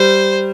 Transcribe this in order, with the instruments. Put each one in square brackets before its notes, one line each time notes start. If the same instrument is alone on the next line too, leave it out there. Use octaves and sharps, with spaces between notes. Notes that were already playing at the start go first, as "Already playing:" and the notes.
Already playing: [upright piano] G3 [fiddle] C5